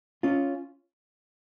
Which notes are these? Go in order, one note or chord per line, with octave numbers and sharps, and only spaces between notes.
C#4 F4